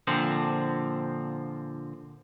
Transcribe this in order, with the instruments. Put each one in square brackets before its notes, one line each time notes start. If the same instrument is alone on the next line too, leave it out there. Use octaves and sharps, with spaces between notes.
[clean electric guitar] A#2 D3 F3 C4